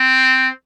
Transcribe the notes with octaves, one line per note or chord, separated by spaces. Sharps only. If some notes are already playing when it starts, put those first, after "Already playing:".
Already playing: C4